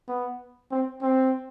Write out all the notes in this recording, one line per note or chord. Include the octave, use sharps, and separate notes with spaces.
B3
C4
C4